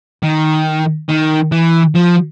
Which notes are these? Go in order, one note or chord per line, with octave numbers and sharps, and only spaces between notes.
D#3
D#3
E3
F3